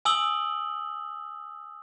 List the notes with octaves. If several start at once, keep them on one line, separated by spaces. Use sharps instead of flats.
G#5 D#6 E6 F#7 G7